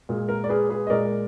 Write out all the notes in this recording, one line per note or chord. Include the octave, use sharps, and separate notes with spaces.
A#2 G#3
A#4
D5
G#4 B4
G#4 B4
D#5
A#2 G#3 A#4 D5